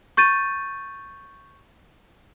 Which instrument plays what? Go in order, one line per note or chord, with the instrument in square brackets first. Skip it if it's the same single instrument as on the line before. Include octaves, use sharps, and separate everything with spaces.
[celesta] C#6 G6 A6 D#7